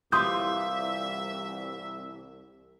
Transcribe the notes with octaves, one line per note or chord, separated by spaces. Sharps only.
C2 E3 F4 G4 E5 C6 D#6 G6